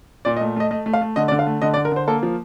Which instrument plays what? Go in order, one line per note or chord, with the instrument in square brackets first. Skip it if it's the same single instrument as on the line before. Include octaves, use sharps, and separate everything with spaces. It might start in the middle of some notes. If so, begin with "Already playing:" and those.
[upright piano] A#2 D5
D#5
A3
A3 D#5
A3 D#5
A3
F5
A3
D3 D#5
D5
D3
F5
A3
D3 D#5
D5
D3
A#4
D3 C5
A#3 A4
F3